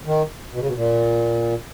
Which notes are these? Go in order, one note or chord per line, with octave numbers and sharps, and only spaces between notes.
D#3
B2
C#3
B2
A#2